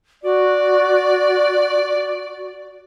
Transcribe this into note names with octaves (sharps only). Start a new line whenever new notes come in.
F#4 D5